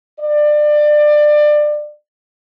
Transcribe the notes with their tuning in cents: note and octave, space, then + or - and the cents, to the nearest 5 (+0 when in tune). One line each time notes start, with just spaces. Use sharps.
D5 +25